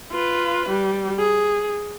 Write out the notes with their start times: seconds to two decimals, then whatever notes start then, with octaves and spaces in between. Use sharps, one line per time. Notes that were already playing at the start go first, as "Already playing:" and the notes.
0.12 F4 B4
0.69 G3
1.19 G#4